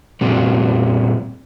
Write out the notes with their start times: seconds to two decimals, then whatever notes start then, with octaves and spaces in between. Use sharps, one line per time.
0.21 A#2 G3 C4 F#4